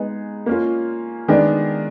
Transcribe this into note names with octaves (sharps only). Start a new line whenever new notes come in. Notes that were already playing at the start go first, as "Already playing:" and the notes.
Already playing: G#3 B3 D#4 G#4
A#3 C#4 F4
D#3 G#3 B3 D4